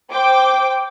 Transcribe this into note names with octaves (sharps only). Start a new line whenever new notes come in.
C5 G5 D6